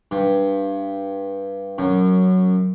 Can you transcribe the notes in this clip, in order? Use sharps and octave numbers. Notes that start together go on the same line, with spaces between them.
G2
F#2